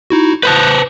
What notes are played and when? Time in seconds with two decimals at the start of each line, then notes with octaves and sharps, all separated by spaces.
0.10 D#4 E4 F#4
0.43 B4 C5 A5 F#6 G6